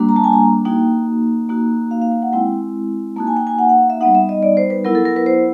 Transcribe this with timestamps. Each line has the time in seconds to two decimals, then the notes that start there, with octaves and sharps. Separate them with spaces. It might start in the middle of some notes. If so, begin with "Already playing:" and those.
Already playing: G3 A#3 D4 F#4
0.09 A#5
0.16 A5
0.24 G#5
0.33 A#5
0.65 A#3 D#4 F#4 G5
1.49 A#3 D#4 F#4
1.91 F5
2.02 F5
2.12 F5
2.22 F#5
2.33 G#3 C4 E4 G5
3.16 A#3 D#4 F#4 A5
3.27 G#5
3.37 G5
3.47 G#5
3.59 F#5
3.69 F#5
3.79 F5
3.90 E5
4.01 G3 B3 D#4 F#5
4.15 E5
4.29 D#5
4.43 D5
4.57 C5
4.70 B4
4.85 F#3 B3 E4 A#4
4.95 A4
5.05 A#4
5.16 B4
5.26 C5